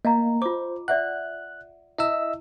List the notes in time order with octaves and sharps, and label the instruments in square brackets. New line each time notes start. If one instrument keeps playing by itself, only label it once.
[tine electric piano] A#3 [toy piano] D#5 F5 A#5
[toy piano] F4 D6 [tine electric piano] C5
[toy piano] D5 E5 F#5 [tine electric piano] F#6
[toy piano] E4 [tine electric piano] D#5 E5 E6